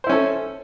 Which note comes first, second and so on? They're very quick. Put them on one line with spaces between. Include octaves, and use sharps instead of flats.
C5 E4 C#4 A4